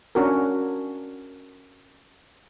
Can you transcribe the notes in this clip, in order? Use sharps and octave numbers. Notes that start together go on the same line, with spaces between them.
C#4 D4 F#4 A#4